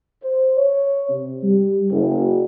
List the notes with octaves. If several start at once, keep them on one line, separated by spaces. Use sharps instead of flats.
C5
C#5
C3
G3
F#1